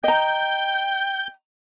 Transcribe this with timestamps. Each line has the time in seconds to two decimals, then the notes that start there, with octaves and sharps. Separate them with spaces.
0.04 D#5 G5 A#5 G6